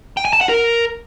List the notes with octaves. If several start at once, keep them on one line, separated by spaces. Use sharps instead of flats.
G5
G#5
A5
F#5
A#4